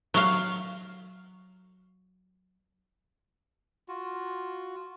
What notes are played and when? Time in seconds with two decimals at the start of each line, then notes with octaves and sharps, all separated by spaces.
0.14 F#3 F5
3.88 F4 F#4